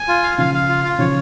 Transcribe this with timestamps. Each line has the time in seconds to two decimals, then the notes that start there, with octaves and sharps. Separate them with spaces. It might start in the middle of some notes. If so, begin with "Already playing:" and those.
Already playing: G#5
0.08 F4
0.23 F5
0.38 C#3 F3 F5
0.54 F5
0.69 F4
0.84 F4
0.99 C#3 F3 C#5